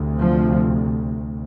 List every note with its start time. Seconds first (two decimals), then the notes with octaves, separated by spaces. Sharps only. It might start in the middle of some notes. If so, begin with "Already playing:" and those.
Already playing: D2 C3
0.19 F3